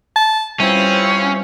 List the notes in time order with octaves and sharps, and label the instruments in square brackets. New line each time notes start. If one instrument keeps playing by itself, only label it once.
[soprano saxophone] A5
[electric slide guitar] G3 B4 [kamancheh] C4 F4 [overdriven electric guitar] C#4 [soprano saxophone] E4